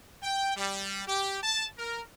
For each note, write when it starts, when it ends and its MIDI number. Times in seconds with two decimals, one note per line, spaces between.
0.23 0.55 79
0.56 1.03 55
1.07 1.39 67
1.43 1.67 81
1.78 2.01 70